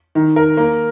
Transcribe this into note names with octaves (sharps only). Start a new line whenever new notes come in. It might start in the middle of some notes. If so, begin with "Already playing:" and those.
D#3
A#4
A#3